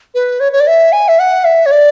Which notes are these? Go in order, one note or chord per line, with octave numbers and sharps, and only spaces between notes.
B4
C#5
C#5
D5
E5
G#5
E5
F#5
E5
C#5
D5